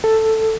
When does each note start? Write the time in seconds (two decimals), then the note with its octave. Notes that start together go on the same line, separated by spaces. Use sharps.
0.04 A4